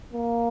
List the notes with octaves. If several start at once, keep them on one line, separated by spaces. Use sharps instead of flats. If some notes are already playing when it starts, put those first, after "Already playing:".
A#3